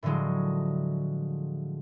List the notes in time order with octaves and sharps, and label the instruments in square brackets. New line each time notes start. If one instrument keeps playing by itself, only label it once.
[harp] A2 D3 F3 F#3 G#3